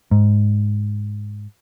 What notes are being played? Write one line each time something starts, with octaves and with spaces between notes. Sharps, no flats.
G#2